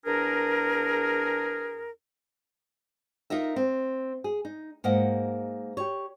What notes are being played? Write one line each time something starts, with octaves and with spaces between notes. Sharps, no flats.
E2 D4 G#4 A#4
D#4 F4 A#4 E5
C4
G#4
D#4
G#2 A#3 D#5 F#5
G4 C#5